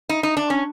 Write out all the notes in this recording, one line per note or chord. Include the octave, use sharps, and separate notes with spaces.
D#4
D#4
D4
C#4